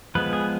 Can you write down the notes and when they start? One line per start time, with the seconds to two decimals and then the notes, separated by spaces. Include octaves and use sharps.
0.15 F3 G#3 B3 B4
0.33 G#4